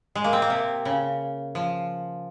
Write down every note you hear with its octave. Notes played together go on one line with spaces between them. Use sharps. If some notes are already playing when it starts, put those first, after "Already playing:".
G#3
A#3
C4
A#3
C3
C#3
F3